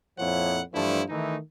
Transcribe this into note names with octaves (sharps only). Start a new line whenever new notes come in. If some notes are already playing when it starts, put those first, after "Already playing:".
F2 A#2 F3 E4 C#5 F#5
G2 E3 F3 A3 D4 E4
D#3 E3 A3 D#4